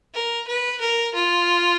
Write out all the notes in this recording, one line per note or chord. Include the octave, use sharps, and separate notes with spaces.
A#4
B4
A#4
F4